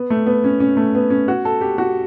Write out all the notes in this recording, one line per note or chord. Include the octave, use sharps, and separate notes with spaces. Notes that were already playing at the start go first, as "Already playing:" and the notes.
Already playing: B3
A3
B3
C#4
C#4
A3
B3
C#4
F#4
A4
G4
F#4